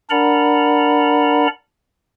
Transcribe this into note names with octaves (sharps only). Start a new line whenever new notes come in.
D4 A#4 D5 F#5 A#5 B5